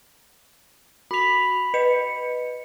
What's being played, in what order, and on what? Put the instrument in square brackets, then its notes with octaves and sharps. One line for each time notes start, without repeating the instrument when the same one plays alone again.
[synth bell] F#4 F7 [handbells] B5 B6
[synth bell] B4 D#5 C#7